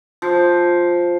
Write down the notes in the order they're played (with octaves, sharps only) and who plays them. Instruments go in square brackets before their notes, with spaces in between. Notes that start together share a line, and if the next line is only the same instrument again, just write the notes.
[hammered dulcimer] F3